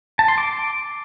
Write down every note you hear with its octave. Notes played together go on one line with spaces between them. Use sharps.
A5
C6
D6